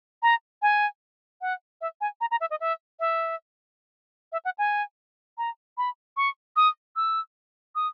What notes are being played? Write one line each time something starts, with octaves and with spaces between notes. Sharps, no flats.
A#5
G#5
F#5
E5
G#5
A#5
A#5
E5
D#5
E5
E5
E5
F#5
G#5
A#5
B5
C#6
D#6
E6
D#6